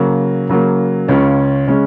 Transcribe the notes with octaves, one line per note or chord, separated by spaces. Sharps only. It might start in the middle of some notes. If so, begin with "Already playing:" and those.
Already playing: C#3 F#3 A#3
C#3 F#3 A#3
C#2 C#3 G#3 C#4
C#3 G#3 C#4